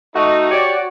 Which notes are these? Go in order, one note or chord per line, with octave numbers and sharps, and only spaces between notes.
A3 D#4 F#4
G4 C#5 D5